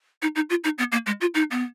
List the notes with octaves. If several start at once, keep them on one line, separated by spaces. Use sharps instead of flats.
D#4
D#4
F4
D#4
B3
A#3
G#3
F4
D#4
B3